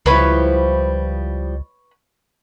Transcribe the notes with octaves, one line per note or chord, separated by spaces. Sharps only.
C#2 F3 G3 E4 B4 C#5 B5